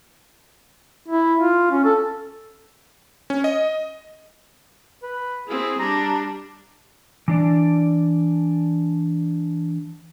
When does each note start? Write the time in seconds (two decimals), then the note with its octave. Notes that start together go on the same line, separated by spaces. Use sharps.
1.08 E4
1.40 F4
1.71 C#4
1.85 A4
3.30 C#4
3.44 D#5
5.03 B4
5.48 C4 E4 G#4
5.79 G3 D4 A#5
7.28 E3 D4 D5